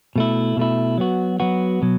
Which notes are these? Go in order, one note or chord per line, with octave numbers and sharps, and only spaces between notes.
B2 A3 E4
B2 A3 E4
F#3 B3 F#4
F#3 B3 F#4
B2 F#3